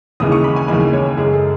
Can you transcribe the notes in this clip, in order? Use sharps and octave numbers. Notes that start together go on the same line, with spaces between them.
D#2 C#3 E3 G#3 D#6
C#6
B5
G#5
D#2 C#3 E3 G#3 G#5
C#5
F#2 C#3 G#3 G#4
A4